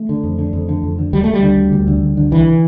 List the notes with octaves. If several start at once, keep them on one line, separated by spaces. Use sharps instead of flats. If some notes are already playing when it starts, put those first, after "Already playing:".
Already playing: A3
D3
F2
D3
F2
D3
F2
D3
D2 G3
A3
D2
G3
D3
D2
D2
D3
D2
D3
C2 E3